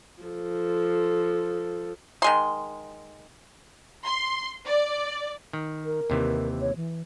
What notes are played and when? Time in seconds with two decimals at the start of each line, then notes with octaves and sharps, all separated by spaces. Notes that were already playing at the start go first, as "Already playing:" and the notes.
0.22 F3 A4
2.22 D#3 G#3 C6
4.05 C6
4.66 D5
5.53 D#3
5.85 A#4
6.10 D#2 C3 E3
6.61 C#5
6.76 E3